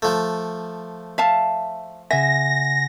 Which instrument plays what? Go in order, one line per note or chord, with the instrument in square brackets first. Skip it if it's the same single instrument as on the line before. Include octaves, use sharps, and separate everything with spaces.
[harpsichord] F3 A3
[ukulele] E5 F5 A5
[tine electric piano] C#3 F#5 G#5 [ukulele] E5 [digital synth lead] A#6